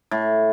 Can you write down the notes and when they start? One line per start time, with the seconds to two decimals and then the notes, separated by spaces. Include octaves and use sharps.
0.11 A2